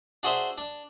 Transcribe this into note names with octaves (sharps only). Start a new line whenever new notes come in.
D4 F#4 G#4 C5 E5
D4